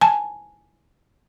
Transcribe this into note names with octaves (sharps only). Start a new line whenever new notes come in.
G#5 A5